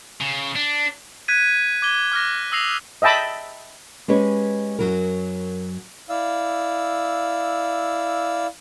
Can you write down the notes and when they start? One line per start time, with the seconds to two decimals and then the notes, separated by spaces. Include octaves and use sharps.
0.21 C#3
0.55 D4
1.28 F#6 G#6 B6 D#7
1.82 D6 G#6 G7
2.12 D6 F6 F#6 A#6
2.52 D#6 E6 A#6 C7 F7
3.02 D#5 E5 G5 A5 B5
4.08 G#3 C#4 G4 B4 C#5
4.79 F#2 F#3 A#4
6.10 E4 D5 F5 E6